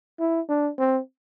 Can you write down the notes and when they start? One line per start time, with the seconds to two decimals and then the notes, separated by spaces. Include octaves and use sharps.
0.20 E4
0.49 D4
0.78 C4